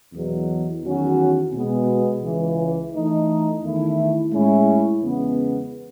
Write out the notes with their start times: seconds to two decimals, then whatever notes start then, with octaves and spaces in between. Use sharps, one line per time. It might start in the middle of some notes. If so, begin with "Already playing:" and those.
0.13 E2 B2 F#3
0.83 E2 D#3 F#3 C#4 F#4
1.53 B2 G#3 B3
2.23 C#2 C#3 E3
2.93 E3 A3 D#4
3.62 E2 D#3 A3 E4
4.32 A2 G#3 C#4 E4
5.02 E2 C#3 G#3 B3